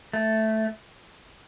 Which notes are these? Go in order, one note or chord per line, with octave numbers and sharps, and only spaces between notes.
A3